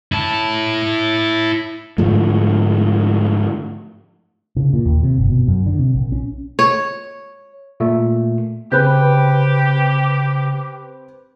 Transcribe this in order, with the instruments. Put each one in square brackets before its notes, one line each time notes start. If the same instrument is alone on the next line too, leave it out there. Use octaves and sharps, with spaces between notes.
[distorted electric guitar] E4 A5
[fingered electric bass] G#2 D3 F3 A3
C#3
A#2
D#2
C3
G1
B2
F#2
D3
C3
A#1
C#4
[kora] C#5
[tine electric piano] A#2 A3
[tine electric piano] C#3 [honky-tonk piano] C4 B4 [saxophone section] G4 [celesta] F#6 G6